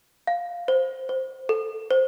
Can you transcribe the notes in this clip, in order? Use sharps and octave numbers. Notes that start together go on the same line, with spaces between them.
F5
C5
C5
A4
C5